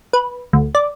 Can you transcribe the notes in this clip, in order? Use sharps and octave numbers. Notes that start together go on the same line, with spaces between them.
B4
D2
D5